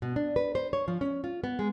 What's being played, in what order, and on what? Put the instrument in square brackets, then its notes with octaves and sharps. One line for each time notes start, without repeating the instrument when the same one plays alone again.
[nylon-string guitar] B2
D4
B4
C5
C#5
F3
C#4
F4
B3
G#3